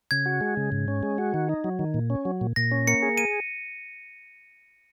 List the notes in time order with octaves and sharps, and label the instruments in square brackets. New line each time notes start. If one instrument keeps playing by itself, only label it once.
[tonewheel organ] C#3 [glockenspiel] G#6
[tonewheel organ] F#4
G#3
C#3
G#2
C#4
G#3
F#4
D#3
D#4
F#3
D#3
A#2
C#4
F#3
A#2
[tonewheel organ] A#2 [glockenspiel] A#6
[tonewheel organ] C#4
[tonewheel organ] A#3 [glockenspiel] C#7
[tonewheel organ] G#4
[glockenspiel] D#7